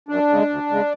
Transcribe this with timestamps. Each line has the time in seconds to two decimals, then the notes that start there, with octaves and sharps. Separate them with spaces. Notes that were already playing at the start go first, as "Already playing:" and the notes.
0.09 F#2 D4
0.29 C#3 G#3
0.49 D2
0.70 C#3 G#3